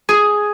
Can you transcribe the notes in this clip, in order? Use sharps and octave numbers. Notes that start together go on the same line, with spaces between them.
G#4